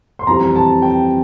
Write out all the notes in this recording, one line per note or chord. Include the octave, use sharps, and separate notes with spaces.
C6
F2 E3 G3 C4 A#5
A5
G5